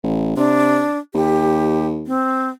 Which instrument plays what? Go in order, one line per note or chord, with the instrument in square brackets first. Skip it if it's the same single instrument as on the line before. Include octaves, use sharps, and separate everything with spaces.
[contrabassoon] A1
[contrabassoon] C3 [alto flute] D4
[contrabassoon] D#2 [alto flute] G4
[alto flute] C4